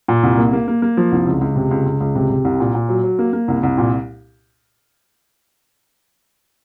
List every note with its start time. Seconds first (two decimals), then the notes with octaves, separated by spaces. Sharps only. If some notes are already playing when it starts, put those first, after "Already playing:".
0.08 A#2
0.23 C2
0.38 A#3
0.53 A#3
0.68 A#3
0.82 A#3
0.97 F3
1.12 C2
1.27 C#2
1.41 C#2
1.56 C3
1.71 C#2
1.86 C#2
2.00 C#2
2.15 C3
2.30 C3
2.45 C2
2.60 A#2
2.74 A#2
2.89 F#3
3.04 F#3
3.19 A#3
3.33 A#3
3.48 C2
3.63 C2
3.78 A#2